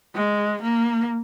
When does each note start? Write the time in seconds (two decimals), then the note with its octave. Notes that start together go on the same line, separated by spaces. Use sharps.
0.15 G#3
0.62 A#3